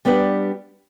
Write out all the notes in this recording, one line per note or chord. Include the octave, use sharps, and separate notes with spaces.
G3 B3 D4 G4 B4